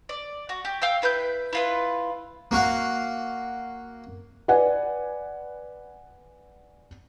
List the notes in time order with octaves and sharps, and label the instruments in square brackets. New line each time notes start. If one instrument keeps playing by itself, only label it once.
[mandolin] D5
F#4
G4
F5 G5 E6
E4 B4 E6 G6
E4 F4 B4
[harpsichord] A#3 F#4 F5 F#5
[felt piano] B4 D5 F#5 G#5